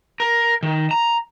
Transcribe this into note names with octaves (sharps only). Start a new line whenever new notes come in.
A#4
D#3
A#5